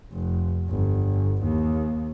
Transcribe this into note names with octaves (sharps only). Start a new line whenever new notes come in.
F1
G1
D#2